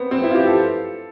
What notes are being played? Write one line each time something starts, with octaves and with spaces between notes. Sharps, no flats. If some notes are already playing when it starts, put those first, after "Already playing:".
Already playing: B3 C4
C4
E4
F4
G4
A4